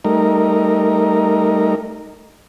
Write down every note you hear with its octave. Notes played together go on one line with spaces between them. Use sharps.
G3 A3 D#4 A#4